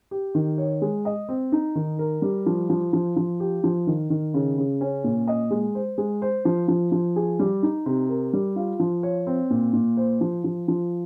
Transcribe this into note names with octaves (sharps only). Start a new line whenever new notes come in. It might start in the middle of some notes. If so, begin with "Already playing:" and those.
G4
D#3
C#5
G#3
D#5
C4
D#4
D#3
A#4
G3
F3
F3
F3
F3
G4
F3
D#3
D#3
C#3
C#3
C#4
A#2
D#5
G#3
C5
G#3
C5
F3
F3
F3
G#4
G3
D#4
C3
A#4
G3
F4
F3
C#5
C4
A#2
A#2
C5
F3
F3
F3